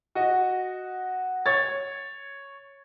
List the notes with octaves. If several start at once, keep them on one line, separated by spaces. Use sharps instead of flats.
F#4 D#5
C#5 G#6 A6